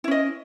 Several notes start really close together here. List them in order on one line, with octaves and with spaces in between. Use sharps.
E4 C#4 D#5